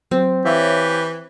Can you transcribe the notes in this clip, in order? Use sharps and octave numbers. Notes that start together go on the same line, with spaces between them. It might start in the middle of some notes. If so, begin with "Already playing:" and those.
F#3 C4
E3 G4 C#5 E5 F5